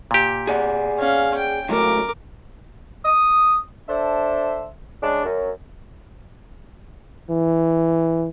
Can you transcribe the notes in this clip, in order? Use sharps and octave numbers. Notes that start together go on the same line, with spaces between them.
A#2 G4
G#4 D5 F#5
C#4 F5
G5
C#2 F#3 A3 A#4 D6
D#6
D4 A4 C5 E5
C#3 G#3 D4
F#2
E3